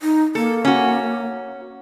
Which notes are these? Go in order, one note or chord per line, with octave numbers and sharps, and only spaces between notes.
D#4
A#3 A4
C#4 F#4